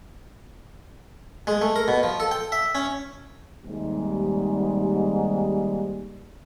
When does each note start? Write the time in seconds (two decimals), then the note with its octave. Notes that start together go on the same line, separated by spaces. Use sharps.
1.47 G#3
1.61 A3
1.76 A#4
1.88 B2
2.03 F3
2.20 A4
2.31 G5
2.52 E5
2.75 C#4
3.66 D#2 G#2 C3 G3